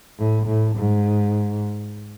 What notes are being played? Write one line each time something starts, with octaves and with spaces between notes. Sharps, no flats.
A2
A2
G#2